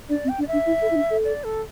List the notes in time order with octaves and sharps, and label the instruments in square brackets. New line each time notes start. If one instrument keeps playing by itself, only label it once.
[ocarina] D4 [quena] D5
[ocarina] C4
[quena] G5
[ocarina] D4
[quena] D5
E5
[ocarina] D4
E4
A4
E4
D4
A4
[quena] D5
A4